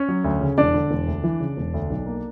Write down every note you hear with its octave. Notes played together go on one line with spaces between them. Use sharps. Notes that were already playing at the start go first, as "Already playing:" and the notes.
Already playing: C#4 C#5
F#3
D2
C#3
E1 D4 D5
D3
E1
D2
E3
C#3
E1
D2
B1
A#3